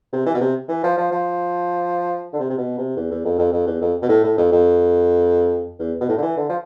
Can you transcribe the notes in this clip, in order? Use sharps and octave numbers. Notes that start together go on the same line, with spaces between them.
C3
E3
B2
C3
E3
F3
F3
F3
D3
C3
C3
B2
C3
E2
E2
F2
F2
F2
E2
F2
B2
A2
A2
F2
F2
E2
B2
A2
D3
E3
D3
F3